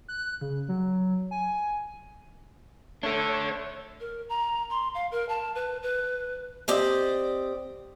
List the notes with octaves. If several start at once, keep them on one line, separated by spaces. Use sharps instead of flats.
F#6
C#3
F#3
G#5
A3 D4 A4 C#5
A#4
A#5
C6
F5
A#4
A5
B4
B4
C4 G4 D5 D#5